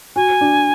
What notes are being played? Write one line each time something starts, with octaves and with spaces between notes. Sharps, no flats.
F#4 G#5
D4